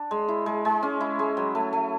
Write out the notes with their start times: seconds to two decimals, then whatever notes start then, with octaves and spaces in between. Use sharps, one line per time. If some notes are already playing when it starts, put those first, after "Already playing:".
Already playing: D4
0.11 G#3
0.28 E4
0.46 G#3
0.65 G#3
0.83 C#4
1.01 E4
1.19 G#3
1.37 F#3
1.55 A3
1.73 A3